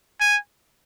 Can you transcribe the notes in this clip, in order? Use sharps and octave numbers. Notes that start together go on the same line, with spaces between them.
G#5